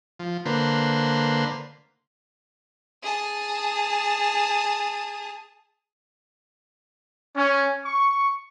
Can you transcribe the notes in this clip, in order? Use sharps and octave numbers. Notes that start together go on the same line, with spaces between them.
F3
D3 A#3 B4 C5
G#4 A5
C#4
C#6